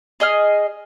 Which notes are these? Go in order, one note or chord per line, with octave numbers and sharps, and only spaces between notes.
G#4 D#5 G#5 F6